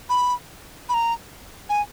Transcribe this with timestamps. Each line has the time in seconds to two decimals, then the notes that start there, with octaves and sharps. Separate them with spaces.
0.09 B5
0.89 B5
0.94 A#5
1.69 G#5